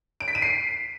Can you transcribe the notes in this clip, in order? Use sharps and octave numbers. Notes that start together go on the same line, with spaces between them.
D7
B6
D#7
C7